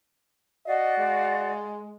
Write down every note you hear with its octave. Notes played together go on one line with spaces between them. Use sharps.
F#4 D5 D#5 F5
G#3